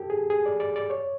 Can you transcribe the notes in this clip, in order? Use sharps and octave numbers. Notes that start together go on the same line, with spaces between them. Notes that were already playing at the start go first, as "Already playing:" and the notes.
Already playing: G4 A4
G#4
G#4
D5
D5
D5
C#5